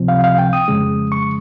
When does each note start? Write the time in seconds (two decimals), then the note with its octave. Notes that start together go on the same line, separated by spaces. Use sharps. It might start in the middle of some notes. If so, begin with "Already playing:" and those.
Already playing: C#2 C3 F3 C4
0.08 F5
0.24 F5
0.39 G5
0.53 D#6
0.68 F2 C#3 G#3
1.12 C#6